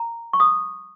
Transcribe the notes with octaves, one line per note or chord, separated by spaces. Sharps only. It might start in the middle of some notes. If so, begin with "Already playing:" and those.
Already playing: A#5
C#6
D#6